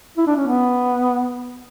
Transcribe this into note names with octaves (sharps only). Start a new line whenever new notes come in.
E4
D4
C#4
B3